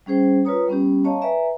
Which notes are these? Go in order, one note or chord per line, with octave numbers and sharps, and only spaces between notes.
G3 C#4 G#4 C5 G5
F4 A#4 B4 C#5 A#5 D#6
G3 B3 C#4 G4
C#5 D#5 F5 A5 A#5 C#6
B4 D5 E5 G#5 A#5